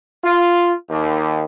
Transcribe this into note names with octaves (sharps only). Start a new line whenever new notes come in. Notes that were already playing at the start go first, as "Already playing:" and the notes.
F4
D#2